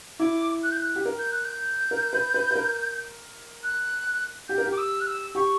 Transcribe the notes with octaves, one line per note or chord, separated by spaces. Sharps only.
E4 D6
F#6
G6
F#6
G4
A#4
G6
F#6
G6
A#4
B4
B4
B4
A#4
F#6
G4 G6
A#4
G4
D6
E6
F#6
E6
G4 C#6